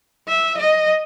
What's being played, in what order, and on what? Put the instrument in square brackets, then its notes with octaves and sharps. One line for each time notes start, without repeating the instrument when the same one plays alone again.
[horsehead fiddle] E5
D#5